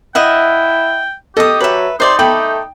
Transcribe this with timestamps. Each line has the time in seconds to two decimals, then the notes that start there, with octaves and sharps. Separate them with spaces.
0.15 E4 D#5 E5 F#5 G5
1.37 G4 A4 D#5 D#6
1.61 F#3 B4 E5
2.00 C3 D#4 C5 D5 C6
2.19 A3 A4 G5 B5 D6